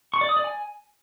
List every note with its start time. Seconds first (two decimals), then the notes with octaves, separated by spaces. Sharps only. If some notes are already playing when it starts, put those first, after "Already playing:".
0.14 C#6
0.21 D5
0.29 D#6
0.37 D5
0.44 G#5